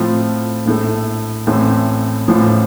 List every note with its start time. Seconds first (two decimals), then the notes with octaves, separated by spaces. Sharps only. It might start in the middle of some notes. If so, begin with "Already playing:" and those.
Already playing: A2 F3 A3 C4 F4
0.65 A#1 A2 A3
1.47 A1 A2 A3 C4
2.28 A1 A2 F3